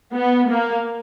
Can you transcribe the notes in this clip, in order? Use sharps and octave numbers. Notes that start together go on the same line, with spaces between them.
B3
A#3